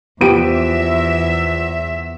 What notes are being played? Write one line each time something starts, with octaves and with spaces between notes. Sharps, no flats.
E2 F3 B3 G4 E5 D7